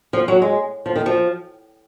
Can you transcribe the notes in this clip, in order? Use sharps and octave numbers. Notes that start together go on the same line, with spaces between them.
F3
F#3
G#3
F3
D#3
F3